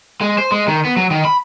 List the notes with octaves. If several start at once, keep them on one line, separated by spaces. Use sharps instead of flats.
G#3
C5
G#3
D#3
B3
F#3
D#3
B5